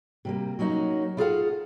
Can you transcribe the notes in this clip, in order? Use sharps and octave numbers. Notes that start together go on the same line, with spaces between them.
C3 G3 A#3
F#3 A#3 C#4 D#4 F#4
E4 F4 G#4 A4 F5 F#5